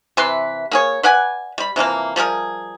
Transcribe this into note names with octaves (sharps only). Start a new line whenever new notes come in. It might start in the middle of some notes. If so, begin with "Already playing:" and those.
C3 E3 B4 C6
A#3 G#4 C#5
B4 D5 F#5 G#5
G3 B5
C3 E3 F3 A#3
F3 G3 G#4 A#4